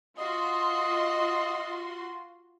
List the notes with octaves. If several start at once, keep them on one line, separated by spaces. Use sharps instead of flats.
F4 F#4 D#5 C6